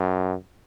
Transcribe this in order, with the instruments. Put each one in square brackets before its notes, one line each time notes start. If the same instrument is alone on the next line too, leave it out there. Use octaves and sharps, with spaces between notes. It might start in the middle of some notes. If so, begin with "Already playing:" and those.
Already playing: [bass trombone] F#2